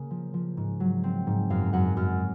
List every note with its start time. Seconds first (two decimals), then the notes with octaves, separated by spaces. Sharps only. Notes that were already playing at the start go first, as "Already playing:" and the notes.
Already playing: C#3 A#3
0.11 F3
0.34 F3
0.57 G#2
0.80 F#3
1.04 C4
1.27 G#2
1.50 F#2 F5
1.73 F#2 F#5
1.97 F#2 F6